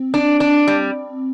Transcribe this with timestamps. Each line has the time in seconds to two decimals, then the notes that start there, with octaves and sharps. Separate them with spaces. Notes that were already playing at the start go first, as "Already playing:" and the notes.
Already playing: C4
0.14 D4
0.40 D4
0.68 G3